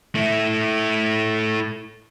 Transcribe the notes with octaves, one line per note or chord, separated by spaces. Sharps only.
A3 E4